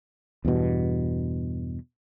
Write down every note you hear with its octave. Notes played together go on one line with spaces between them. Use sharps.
E2 G2 B2